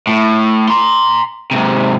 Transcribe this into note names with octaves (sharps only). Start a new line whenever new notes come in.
A2
A#5 C6
G#2 C3